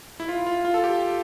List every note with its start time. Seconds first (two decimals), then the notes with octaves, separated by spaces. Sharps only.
0.20 E4
0.29 F4
0.47 F4
0.65 F4
0.74 A4
0.84 G4